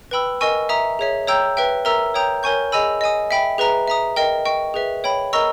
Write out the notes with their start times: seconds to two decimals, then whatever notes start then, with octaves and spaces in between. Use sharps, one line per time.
0.11 B4 G5 B5 E6
0.41 A#4 D#5 G#5 C#6 E6
0.69 E5 A#5 D#6
0.99 G#4 C#5 E5
1.27 C#5 G5 A#5 E6 G6
1.57 B4 E5 G5
1.85 A#4 E5 A#5 E6
2.14 C#5 G5 A#5 D#6 G6
2.43 A#4 C#5 G#5 C#6 G6
2.72 G#4 D#5 G#5 B5 E6
3.01 D#5 G#5 D#6
3.31 E5 G5 B5
3.58 G#4 B4 E5 A#5
3.88 E5 A#5 D#6
4.16 A#4 D#5 G5
4.45 D#5 G5 C#6
4.74 G#4 B4 E5
5.04 C#5 G5 B5
5.33 A#4 D#5 A#5 C#6 E6